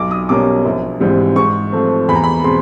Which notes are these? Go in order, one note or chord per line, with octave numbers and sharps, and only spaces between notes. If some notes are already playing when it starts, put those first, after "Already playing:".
Already playing: B1 D6
D#6
B2 G3 A#3 C#4 D6
A#1
G#2 E3 G3 C4
G#2 C#6
F3 A3 C4
E2 B5
A#5
B5
B2 G#3 C4 C6